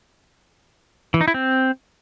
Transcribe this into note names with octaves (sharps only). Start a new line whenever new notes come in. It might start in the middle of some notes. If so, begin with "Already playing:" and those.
E3
D#4
E4
C4